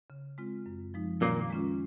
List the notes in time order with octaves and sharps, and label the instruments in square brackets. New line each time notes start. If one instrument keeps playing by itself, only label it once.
[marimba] C#3
G#3 C4 F4
F#2
F3 G#3 D#4
[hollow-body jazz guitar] A#2 A#3 [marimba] D#3
[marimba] G#3 C#4 F4